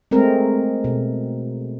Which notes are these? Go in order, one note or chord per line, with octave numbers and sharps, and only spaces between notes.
G#3 A3 C4 A#4
B2